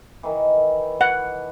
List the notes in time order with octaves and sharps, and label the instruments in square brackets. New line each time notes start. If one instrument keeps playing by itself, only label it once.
[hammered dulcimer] D#3 E3
[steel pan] F#5